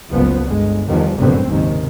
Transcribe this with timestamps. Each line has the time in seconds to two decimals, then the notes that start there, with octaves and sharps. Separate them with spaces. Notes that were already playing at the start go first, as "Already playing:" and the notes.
0.10 F#1 C#2 F3 B3
0.44 G1 G#3
0.87 E2 D#3 F3 G3
1.15 G1 F#2 A2 D3 B3 C4
1.46 F#1 D#2 G#2 C3 D#3